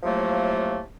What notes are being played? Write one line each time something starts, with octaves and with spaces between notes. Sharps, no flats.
A2 C3 F3 F#3 A3 A#3